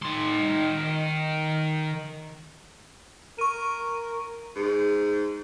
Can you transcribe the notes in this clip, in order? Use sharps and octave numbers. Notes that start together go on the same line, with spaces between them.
D#3 C6
A#4 C#6 D#7
G#2